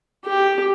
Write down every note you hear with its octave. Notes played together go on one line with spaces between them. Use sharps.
G4